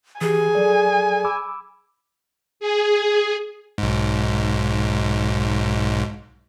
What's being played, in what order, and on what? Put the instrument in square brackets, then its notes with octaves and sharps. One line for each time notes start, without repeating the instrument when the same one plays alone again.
[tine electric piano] E3 G4 [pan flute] G#4 [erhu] G#5
[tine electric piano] F#3 A4 D5
B5 D6 E6
[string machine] G#4
[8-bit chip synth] B1 G#2